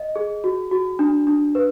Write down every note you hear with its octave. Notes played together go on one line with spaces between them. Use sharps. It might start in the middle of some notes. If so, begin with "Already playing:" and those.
Already playing: D#5
G#4
F#4
F#4
D4
D4
B4